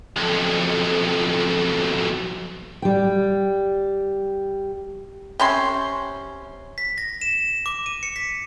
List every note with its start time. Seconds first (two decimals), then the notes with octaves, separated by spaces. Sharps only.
0.17 B1 F2
2.82 G3 G5
5.40 C3 C#4 C6
6.78 B6
6.98 A#6
7.21 E7
7.66 D6
7.86 D#7
8.03 C#7
8.16 B6